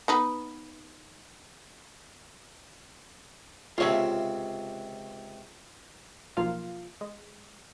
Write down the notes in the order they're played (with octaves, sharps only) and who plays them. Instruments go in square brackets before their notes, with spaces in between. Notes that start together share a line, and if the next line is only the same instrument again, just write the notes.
[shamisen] B3 D#4 B4
[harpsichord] C#2 C3 [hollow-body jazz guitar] F4 C#5 E5
[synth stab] B1 F3 A#3 F4 F5
G#3